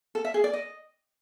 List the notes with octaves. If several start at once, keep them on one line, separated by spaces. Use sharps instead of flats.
A4
E5
G#4
D5
D#5